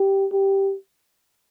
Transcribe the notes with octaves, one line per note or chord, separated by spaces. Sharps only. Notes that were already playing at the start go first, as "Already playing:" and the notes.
Already playing: G4
G4